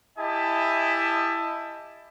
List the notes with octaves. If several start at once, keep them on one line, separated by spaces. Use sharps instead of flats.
E4 G4 D#5 G#5 A5